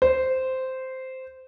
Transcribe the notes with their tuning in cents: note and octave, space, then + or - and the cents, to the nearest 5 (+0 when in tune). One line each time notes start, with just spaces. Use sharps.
C5 -10